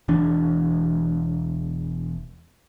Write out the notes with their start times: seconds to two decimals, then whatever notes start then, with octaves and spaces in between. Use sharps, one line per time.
0.08 E1 E3 D4